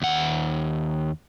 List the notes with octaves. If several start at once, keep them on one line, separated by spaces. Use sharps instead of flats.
D#2 F#5